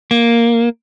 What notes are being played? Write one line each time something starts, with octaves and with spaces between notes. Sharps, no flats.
A#3